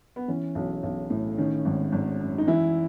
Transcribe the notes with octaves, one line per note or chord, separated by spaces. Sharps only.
B3
E3 C#4
B1
B1
A2
D#3 C#4
G#1
G#1
F#2
D#4
E3 E4